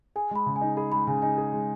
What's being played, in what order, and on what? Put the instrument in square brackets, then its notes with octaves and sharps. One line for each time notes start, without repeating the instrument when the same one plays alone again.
[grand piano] G#4 [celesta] G#5
[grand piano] G#3 [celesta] B5
[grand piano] C#3
[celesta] G#5
[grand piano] D#4
[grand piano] G#4 [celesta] B5
[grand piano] G#3 [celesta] B5
[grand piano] C#3 [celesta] G#5
[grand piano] D#4 [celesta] G#5
[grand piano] G#4
G#3